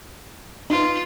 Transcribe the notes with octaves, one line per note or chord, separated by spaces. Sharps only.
D#4 F4 B4